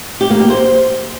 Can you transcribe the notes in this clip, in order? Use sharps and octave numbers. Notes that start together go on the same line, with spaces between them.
G4
A#3
G4
C5